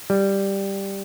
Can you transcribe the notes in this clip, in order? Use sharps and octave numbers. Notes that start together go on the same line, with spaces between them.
G3